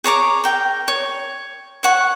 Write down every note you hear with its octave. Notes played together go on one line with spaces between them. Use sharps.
G#4 C#5 A#5 D6
A#4 G5
C#5
C#5 F#5 C#6